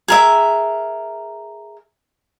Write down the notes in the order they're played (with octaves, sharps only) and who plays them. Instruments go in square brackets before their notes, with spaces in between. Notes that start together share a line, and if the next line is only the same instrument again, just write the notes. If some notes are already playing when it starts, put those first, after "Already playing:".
[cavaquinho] G#4 A#4 E5